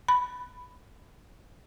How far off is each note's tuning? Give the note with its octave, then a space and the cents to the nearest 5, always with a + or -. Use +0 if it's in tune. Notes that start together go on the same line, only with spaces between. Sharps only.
B5 +5